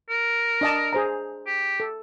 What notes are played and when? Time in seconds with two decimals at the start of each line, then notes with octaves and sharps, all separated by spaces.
0.10 A#4
0.61 D4 D#5 A5
0.93 G#4 C5 A#5
1.47 G4
1.80 A4